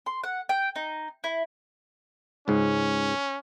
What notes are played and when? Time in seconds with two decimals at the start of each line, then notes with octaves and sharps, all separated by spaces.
0.06 C6
0.23 F#5
0.49 G5
0.75 D#4
1.24 E4
2.48 C#2 G#2 C#4